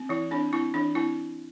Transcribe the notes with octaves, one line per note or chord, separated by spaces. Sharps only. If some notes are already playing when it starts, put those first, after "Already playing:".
Already playing: C4
E3 E4
C4 D4
C4 E4
E3 D4
C4 E4